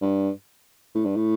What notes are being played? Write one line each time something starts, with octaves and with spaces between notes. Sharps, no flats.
G2
A2
G2
A2